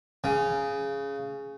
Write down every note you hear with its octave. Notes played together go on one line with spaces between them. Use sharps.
C#3